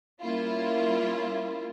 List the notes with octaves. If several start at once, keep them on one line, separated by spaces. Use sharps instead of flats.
G3 A#3 C#4 E4 F4